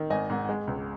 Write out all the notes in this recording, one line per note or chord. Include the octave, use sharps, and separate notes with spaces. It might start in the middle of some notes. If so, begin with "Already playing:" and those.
Already playing: D#3
G#1 D#5 G#5
G#2
G#3
C#2